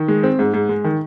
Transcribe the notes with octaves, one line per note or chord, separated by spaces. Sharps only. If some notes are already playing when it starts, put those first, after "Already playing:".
Already playing: D#3
G#3
C4
G#2
G#2
G#3
D#3